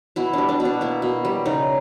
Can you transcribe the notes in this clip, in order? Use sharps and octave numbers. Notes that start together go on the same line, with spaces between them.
B2 E4
G3 D4
D4
B2
D4
A#3 E4
B2
G3
C#3 D#4